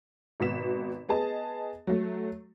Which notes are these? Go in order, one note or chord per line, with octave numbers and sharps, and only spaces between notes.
G#1 B2 F#4 B6 E7
B3 G#4 D#5 A5
F#3 A3